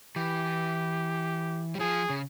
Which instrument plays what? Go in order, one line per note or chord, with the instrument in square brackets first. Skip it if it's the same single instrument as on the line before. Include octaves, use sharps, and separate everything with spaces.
[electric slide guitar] E3 [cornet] G4
[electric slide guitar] G3
[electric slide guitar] F3 [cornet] G#4
[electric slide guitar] C#3